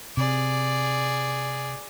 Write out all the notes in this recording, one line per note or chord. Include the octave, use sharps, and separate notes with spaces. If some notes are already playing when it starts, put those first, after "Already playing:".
C3 G#4 D5